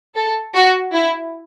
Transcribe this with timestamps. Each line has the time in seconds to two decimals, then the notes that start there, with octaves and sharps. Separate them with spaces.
0.15 A4
0.55 F#4
0.93 E4